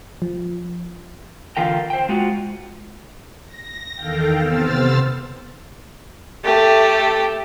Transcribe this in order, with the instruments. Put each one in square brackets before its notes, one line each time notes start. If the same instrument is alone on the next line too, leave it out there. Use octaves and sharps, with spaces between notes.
[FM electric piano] F3
[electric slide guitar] D3 E3 F4 A#4 G5
C5 G5
G#3 F4 F#4
[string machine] A#6
E2 D#3 A4 F5 G5
C3 B3 C5 E6 F6 A6
[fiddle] A3 G4